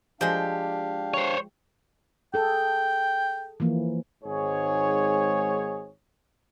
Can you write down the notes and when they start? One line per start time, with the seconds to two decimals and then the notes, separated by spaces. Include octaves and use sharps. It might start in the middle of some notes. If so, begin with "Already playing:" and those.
0.21 F3 G#3 D4 G4 F5
1.14 C5 C#5
2.34 G#4 A4 G5
3.60 E3 F3 A#3
4.24 G#1 G#2 G#4 C#5